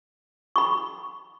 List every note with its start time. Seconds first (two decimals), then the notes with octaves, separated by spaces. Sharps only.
0.56 B5 C#6